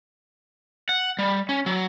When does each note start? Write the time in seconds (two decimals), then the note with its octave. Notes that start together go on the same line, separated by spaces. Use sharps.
0.89 F#5
1.19 G3
1.49 C#4
1.66 F#3